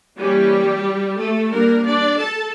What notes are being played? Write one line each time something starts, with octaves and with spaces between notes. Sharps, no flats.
E3 G3 A#3 C#4 G4
A3 A4
G3 A#3 D4 A#4
D4 D5
A4 A5